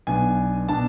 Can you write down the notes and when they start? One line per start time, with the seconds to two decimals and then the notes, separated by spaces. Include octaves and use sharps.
0.07 B1 B2 B3 D4 G#5
0.69 B2 B3 D4 A5